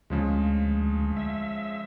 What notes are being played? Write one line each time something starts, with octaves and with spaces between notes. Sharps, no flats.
D2 C#3 F3 G#3
E5